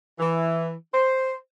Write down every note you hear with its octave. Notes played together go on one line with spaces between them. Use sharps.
E3
C5